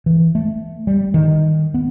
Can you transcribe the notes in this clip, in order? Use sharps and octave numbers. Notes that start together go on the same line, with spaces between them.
E3
A3
G3
D#3
B3